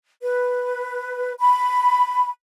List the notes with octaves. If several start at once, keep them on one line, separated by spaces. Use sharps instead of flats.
B4
B5